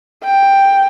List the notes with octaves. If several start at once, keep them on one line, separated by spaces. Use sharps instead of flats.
G5